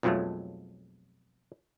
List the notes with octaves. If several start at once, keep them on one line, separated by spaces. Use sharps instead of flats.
B1 F2 F3 F#3 G#3 A3